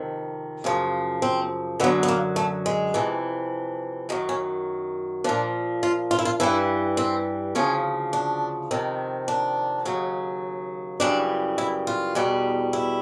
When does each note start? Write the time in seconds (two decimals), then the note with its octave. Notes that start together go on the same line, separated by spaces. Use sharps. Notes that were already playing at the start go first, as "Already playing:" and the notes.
Already playing: F2 C3 D#3
0.64 F#2 C#3 F3
1.22 C4
1.80 F#2 D3 F#3 B3
2.03 B3
2.08 A#3
2.36 A3
2.66 G#3
2.94 F2 C3 E3
4.09 F#2 D#3 F#3 G#3
4.29 C#4
5.24 A#2 F3 D4
5.83 F4
6.11 F4
6.19 E4
6.25 F4
6.40 G2 E3 G3 E4
6.97 C4
7.55 D2 C#3 F3 C#4
8.13 D4
8.71 F2 C3 D#3
9.28 D4
9.85 D#2 C#3 F#3
11.00 F#2 C#3 E3 G3 D4
11.58 E4
11.87 F4
12.15 E2 B2 G3
12.73 E4